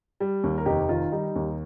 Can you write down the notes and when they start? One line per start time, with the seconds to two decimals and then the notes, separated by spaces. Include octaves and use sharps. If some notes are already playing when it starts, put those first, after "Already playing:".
0.20 G3
0.44 D#2
0.58 A#4
0.66 F1 D#4 G4
0.89 D#3 F4
1.12 G3 D#4
1.35 D#2